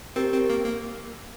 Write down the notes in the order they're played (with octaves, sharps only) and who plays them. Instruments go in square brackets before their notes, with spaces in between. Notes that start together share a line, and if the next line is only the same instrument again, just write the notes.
[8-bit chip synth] C4 [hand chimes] G4 A#4
[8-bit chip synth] C4
A#3
A#3